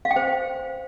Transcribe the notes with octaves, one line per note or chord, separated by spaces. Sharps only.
F5
G5
C5